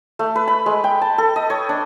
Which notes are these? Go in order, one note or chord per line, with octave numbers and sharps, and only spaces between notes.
A3
B4
B5
G#3
G5
A5
A4
D#5
C#5
D4